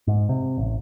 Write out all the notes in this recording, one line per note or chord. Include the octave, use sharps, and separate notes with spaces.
G#2
C3
A1